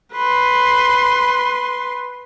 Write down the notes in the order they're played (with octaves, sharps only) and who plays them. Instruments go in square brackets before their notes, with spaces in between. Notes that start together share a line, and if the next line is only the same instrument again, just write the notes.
[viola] B4 C6